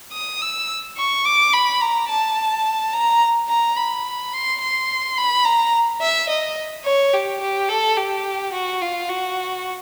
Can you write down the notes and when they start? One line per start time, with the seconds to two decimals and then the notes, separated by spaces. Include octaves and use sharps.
0.13 D#6
0.41 E6
0.97 C#6
1.25 D6
1.53 B5
1.81 A#5
2.09 A5
2.93 A#5
3.49 A#5
3.76 B5
4.33 C6
4.61 C6
5.17 B5
5.45 A#5
6.01 E5
6.29 D#5
6.85 C#5
7.13 G4
7.41 G4
7.69 A4
7.96 G4
8.53 F#4
8.82 F4
9.09 F#4